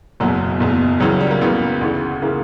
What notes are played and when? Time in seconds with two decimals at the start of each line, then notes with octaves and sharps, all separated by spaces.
0.20 F#1 E2 B2 F#3
0.60 F#1 E2 B2
1.00 C#2 C#3 E3 F#3
1.11 F#3
1.21 G3
1.31 A#3
1.41 C#2 C#3 E3 B3
1.81 D2 C#3 E3
2.22 C#3 E3 A#3